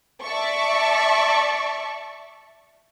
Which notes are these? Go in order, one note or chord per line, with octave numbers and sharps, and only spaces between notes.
D5 E5 A5 C#6